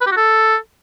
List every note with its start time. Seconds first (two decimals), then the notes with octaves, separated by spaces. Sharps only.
0.01 B4
0.06 G4
0.11 F#4
0.17 A4